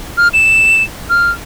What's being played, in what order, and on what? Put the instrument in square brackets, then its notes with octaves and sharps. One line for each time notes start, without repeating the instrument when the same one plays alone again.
[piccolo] F6
E7
F6